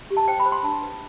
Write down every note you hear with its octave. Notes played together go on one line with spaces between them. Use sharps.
G4
A5
C5 G5
B5
C5
C6
D4 A5
B4